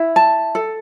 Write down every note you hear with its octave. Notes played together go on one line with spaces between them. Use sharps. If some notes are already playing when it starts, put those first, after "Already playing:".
Already playing: E4
A5
A4